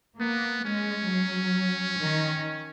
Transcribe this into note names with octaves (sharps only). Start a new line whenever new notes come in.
A#3 B3
G#3 C#4
F#3
D#3